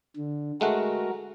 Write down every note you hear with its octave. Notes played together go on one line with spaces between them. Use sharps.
D3
G#3 A3 F#4 A#4 F#5